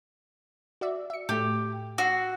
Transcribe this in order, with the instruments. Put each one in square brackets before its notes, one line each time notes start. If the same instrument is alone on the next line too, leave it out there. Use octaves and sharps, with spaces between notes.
[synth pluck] F#4 D5 E5
E5 C#7
[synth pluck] A2 A3 [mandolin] G4
[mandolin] F#4 [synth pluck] E6 C7